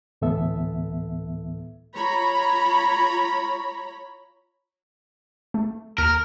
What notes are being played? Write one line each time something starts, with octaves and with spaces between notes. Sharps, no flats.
D2 A2 E3 B3 A4 E5
F4 C#5 A#5 B5
A3
D#2 A#4 F6